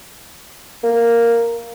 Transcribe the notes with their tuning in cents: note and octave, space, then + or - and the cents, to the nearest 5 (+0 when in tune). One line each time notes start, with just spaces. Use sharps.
A#3 -5